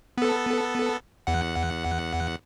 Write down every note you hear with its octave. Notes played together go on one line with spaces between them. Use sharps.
B3 A4
E2 F#5